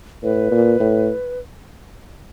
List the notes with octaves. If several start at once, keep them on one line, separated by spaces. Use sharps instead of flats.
A2 B4
A#2
A2